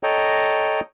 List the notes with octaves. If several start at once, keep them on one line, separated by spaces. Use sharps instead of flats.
A4 C#5 D#5 G5 A#5